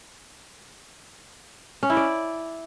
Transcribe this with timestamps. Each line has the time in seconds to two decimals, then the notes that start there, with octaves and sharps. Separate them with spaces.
1.83 C#4
1.90 E4
1.97 D5